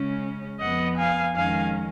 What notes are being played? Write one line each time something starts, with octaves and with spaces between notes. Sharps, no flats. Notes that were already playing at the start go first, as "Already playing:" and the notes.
Already playing: C#3 G#3 C#4
F2 F3 B3 D#5 F#5
F5 G#5
F2 D#3 G#3 C#4 F5 G#5